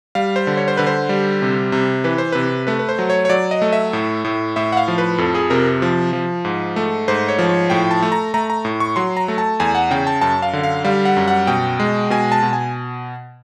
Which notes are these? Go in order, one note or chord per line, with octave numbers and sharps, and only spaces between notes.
G3 F5
C5
D3
C#5
C5
D3 B4
C5
G3
C3
C3
E3 B4
C5
C3 B4
A3 B4
B4
C5
F#3
C#5
C#5
F#3 D5
D#5
A3
E5
A2
A2
A2 E5
F#5
F5
F3
B4
F2 A4
G#4
C3 A#4
F3
F3
G#2
A3
G#2 C5
C#5
F3
C#5
A2 G5
A5
A3
A#5
A3 A#5
A#5
A2
C#6
F#3 C6
A#5
A3
A5
E2 G#5
F#5
C#3 G5
A5
F#2 A5
F5
D3
F5
G3 F5
F#5
F#2
F#5
B2 G5
G#3
B2 G#5
A5
B2
G#5